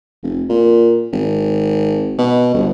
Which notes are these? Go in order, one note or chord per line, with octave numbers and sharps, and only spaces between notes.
F1
A#2
G#1
B2
G1